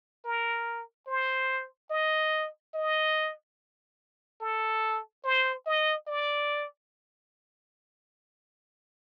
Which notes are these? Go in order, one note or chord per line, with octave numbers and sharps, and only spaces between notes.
A#4
C5
D#5
D#5
A4
C5
D#5
D5